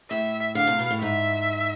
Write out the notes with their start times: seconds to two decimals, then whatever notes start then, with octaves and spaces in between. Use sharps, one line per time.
0.11 A2 E5
0.55 D3 F5
0.67 C3
0.79 B2
0.90 A2
1.02 G#2 E5